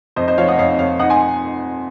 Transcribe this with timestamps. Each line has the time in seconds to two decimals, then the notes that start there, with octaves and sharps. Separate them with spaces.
0.16 F2 C5 D#5
0.28 C5 D#5
0.38 F3 C#5 F5
0.48 D#5 F#5
0.58 F2 C#5 F5
0.78 F2 C#5 F5
0.99 D#4 D#5 F#5
1.10 G#5 C6